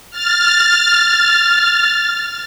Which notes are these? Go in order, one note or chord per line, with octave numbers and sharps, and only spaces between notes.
F6 A6